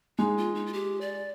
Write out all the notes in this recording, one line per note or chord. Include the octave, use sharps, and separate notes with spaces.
G#3 D#4
F4
D#4
F4
G4
D5